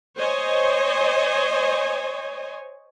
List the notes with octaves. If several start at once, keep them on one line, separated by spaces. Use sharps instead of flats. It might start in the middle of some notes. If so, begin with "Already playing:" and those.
C5 C#5 D#5 G#5